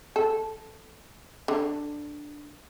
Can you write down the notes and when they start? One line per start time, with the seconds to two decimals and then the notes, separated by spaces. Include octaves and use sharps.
0.16 A4
1.48 D3